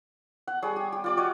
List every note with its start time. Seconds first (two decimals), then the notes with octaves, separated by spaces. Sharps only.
0.47 F#5
0.62 G3 G#4 C#5
0.76 G4
0.92 G4
1.04 F4 D5 D6
1.17 F#4 C#5 D#5